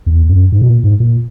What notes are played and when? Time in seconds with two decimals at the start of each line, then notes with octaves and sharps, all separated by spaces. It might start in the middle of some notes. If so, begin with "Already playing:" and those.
0.06 E2
0.29 F#2
0.52 G#2
0.62 B2
0.69 A#2
0.84 G#2
1.00 A#2